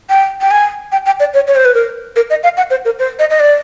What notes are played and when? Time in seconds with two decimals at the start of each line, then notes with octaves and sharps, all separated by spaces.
0.10 G5
0.41 G5
0.51 G#5
0.92 G5
1.06 G5
1.20 D5
1.34 C#5
1.47 C#5
1.56 C5
1.65 B4
1.74 A#4
2.16 A#4
2.30 D#5
2.43 F5
2.57 F#5
2.71 C5
2.85 A#4
2.99 C5
3.19 D#5
3.30 D#5
3.40 D5